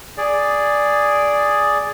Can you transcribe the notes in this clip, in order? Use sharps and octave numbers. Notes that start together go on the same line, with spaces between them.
G#4 D5